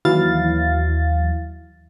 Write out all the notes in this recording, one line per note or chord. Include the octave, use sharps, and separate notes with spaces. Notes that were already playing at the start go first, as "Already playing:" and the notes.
D#2 E3 F#3 E4 F5 A6